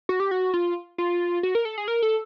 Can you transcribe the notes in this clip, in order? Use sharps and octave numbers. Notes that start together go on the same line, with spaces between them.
F#4
G4
F#4
F4
F4
F#4
A#4
A4
G#4
A#4
A4